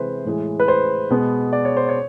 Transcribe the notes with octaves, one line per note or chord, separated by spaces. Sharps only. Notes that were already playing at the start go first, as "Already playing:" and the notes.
Already playing: C3 E3 G#3 B4 C5
A2 E3 G#3
B4
C5
B2 G#3 B3
D5
C#5
C5
C#5